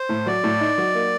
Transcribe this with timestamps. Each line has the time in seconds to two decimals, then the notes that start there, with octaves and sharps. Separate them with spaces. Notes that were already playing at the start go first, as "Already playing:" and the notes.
Already playing: C5
0.09 A2
0.26 F#3 D5
0.44 A2
0.61 D#4
0.78 F#3
0.94 A#3